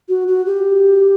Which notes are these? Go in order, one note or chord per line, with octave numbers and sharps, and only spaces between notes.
F#4
F#4
G4